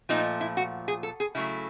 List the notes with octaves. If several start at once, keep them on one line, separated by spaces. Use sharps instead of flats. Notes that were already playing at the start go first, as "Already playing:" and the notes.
A#2 F3 A3 D#4
E4
F#4
G#4
A4
G#4
C#3 F#3 A3 E4